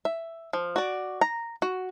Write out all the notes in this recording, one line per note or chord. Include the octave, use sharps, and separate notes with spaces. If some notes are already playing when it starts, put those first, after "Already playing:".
E5
F3
F#4 D5
A#5
F#4